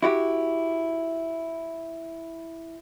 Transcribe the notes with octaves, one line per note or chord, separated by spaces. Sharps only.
E4 F#4 G4